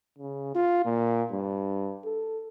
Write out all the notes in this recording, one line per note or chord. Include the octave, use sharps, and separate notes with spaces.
C#3
F4
A#2
G2
A4